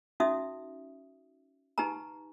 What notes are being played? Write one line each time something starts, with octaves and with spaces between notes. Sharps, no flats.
C#4 D#4 F#4 E5 D#6
D#4 G4 B4 G#5 A#5